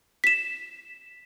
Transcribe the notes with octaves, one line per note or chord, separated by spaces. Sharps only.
B6 E7